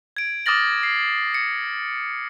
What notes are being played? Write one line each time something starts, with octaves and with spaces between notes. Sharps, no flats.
G#6 D7
D6 D#6 F6 A6 A#6 F#7
C7
C#7